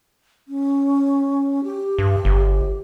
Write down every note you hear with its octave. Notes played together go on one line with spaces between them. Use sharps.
C#4
G4
G2
G1